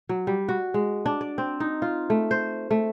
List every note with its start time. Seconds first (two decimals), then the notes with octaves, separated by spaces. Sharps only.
0.09 F#3
0.27 G3
0.49 F#4
0.74 G#3
1.06 D4
1.21 D5
1.38 C4
1.60 D#4
1.82 F4
2.10 A3
2.31 C5
2.71 A3